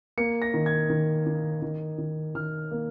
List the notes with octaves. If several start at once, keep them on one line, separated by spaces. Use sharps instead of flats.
A#3 C#7
A#6
D#3
G#6
D#3
D#3
D#3
D#3
D#3 F6
A#3